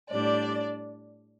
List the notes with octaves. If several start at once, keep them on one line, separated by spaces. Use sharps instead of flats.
A2 G3 D4 D5